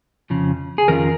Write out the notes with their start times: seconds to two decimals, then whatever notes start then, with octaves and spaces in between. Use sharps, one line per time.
0.30 F2 C#3 F3
0.78 G#4
0.88 F2 D#3 C#4 F4 A#4